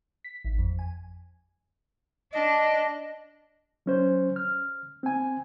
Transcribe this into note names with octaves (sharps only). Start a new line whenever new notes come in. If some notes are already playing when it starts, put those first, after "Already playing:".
B6
G#1
F2
G#5
D4 D#5
F#3 C#4 C5
F6
C4 G#5